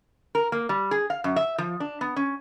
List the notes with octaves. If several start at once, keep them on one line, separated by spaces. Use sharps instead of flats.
A#4
A#3
G3
G#4
F5
F#2
E5
F3
D4
B3
C#4